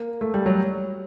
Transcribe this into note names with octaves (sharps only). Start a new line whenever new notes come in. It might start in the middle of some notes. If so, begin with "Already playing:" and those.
Already playing: A#3
A3
G3
F#3